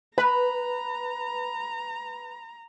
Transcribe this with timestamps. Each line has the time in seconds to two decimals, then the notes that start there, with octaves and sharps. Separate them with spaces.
0.18 B4 A#5 B5